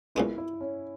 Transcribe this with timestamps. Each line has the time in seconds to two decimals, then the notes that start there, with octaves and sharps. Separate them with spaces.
0.15 B1 A#2 G#3 E4
0.38 E4
0.61 C#4